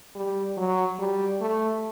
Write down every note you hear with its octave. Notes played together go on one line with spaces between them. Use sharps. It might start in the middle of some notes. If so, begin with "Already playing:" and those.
G3
F#3
G3
A3